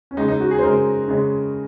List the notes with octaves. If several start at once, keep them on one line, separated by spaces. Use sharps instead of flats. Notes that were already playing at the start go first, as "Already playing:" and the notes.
C#4
C#3 G#3 D#4
D#4
F#4
G#4
C5
C#3 G#3 A#4
C#3 G#3